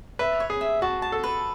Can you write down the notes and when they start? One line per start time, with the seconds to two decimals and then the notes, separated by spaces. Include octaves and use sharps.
0.19 B4 E5
0.40 C#5
0.50 G#4
0.61 E5
0.82 F#4 A5
1.02 A5
1.12 A4
1.23 B4